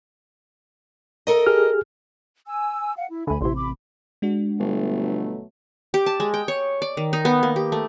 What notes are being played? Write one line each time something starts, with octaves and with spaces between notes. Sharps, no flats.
A4 A#4 D#5
G4 G#4 F6
G#5 E6
F5 F#5
E4
D2 D3 G#5 B5
A1 C3 E4 C6
B5 D6
G#3 D4 F#4
G1 B2 F#3 A3
G4
A5
G#3
G5
C#5
D5
D#3
D#4
B3
A#3
G4
A3